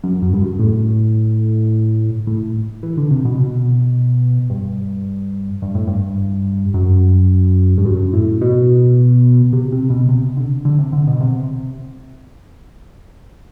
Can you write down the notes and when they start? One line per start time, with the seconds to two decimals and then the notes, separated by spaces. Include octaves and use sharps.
0.04 F#2
0.22 F#2
0.34 G2
0.41 F#2
0.59 A2
2.27 A2
2.83 E3
2.97 D3
3.11 C3
3.25 B2
3.38 B2
4.50 G2
5.62 G2
5.75 A2
5.88 G2
6.74 F#2
7.78 G2
7.85 F#2
8.13 A2
8.41 B2
9.53 C3
9.72 C3
9.90 B2
10.09 C3
10.37 D3
10.65 D3
10.79 C3
10.93 D3
11.07 B2
11.20 C3